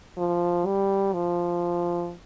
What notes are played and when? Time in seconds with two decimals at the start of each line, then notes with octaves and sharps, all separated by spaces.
0.18 F3
0.66 G3
1.13 F3